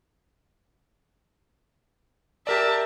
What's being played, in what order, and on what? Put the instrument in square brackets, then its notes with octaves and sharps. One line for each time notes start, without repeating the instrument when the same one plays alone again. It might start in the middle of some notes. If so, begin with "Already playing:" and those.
[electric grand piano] G4 A#4 D5 [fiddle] E5 A5